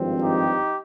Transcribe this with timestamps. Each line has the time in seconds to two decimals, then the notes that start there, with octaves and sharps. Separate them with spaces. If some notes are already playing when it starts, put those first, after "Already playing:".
Already playing: G#1 G2 F3 C4
0.21 D#4 G4